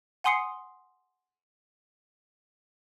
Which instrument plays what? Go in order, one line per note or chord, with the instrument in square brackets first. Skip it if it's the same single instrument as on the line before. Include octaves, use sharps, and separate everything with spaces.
[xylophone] F#5 G#5 C6 D#6 C7 C#7